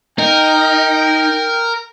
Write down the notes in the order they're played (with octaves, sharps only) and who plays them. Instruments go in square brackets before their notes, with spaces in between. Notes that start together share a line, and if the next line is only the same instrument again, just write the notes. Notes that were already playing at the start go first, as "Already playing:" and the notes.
[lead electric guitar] D#4 [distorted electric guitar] A#4 [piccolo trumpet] G5